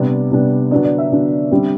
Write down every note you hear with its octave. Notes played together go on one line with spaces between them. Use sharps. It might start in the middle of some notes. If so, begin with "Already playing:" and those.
Already playing: C3 G3 B3 D4 D5
C3 G3 B3 D4
D3 F#3 B3 D4 D5
D5
E5
D3 F#3 B3 D4
D3 G3 C4